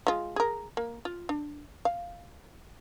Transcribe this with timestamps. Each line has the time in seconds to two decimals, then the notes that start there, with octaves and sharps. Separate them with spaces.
0.07 G#3 F4
0.36 G#4 A#4
0.77 A#3
1.05 F4
1.29 D4
1.85 F5